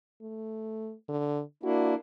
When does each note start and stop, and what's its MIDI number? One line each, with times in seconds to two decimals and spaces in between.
0.21 0.94 57
1.09 1.42 50
1.63 1.95 58
1.63 1.95 62
1.63 1.95 64
1.63 1.93 66